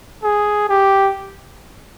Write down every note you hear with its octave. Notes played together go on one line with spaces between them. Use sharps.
G#4
G4